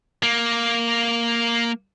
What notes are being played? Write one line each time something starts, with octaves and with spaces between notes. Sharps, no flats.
A#3